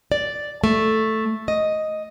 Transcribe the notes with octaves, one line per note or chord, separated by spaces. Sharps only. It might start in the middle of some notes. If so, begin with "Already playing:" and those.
D5
A3
D#5